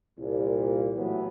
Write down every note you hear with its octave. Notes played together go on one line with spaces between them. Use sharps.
C2 A#2
A2 E3 F#3 B3